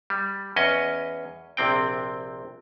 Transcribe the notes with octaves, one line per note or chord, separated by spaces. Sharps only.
G3
E2 C#4 D#5
A#1 C3 C4 G5